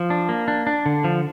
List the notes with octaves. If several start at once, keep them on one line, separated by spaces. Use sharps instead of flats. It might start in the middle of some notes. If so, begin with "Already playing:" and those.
Already playing: F3
D4
A#3
D4
D4
D3
F3